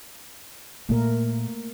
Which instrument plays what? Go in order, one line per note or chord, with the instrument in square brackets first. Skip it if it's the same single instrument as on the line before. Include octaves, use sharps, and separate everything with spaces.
[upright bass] A#2 [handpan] A3 A#3 A#4